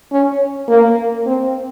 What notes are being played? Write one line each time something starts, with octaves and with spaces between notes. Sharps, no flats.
C#4
A#3
C4